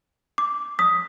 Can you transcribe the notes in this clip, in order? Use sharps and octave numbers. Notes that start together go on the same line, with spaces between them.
D6
D#6 B6